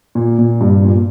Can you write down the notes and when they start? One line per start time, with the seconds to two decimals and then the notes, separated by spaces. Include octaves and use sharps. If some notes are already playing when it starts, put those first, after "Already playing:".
0.15 A#2
0.39 A#2
0.61 G2
0.85 A#2